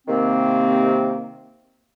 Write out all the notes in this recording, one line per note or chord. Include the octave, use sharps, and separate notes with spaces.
C3 D#3 A#3 C4